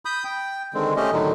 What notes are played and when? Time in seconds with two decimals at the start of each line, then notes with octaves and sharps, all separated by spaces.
0.05 B5 D#6 G6
0.24 G5
0.74 D3 D#3 G#3 C4
0.96 A3 C#4 G4 D#5
1.12 A2 D3 D#3 F#3